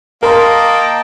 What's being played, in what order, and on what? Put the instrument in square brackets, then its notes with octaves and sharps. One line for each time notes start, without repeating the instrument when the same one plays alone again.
[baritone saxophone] A#3 [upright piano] A#4 A#5 C6 [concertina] D#5 G5 A5